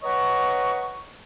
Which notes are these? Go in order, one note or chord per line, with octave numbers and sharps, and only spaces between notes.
B4 C#5 D#5 F#5 A#5 C#6